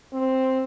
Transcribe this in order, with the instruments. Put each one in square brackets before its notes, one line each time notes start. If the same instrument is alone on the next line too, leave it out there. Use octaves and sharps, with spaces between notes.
[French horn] C4